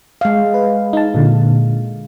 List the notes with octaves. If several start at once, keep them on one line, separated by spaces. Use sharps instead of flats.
G#3 F5
B4
D#4 A5
A#2 D3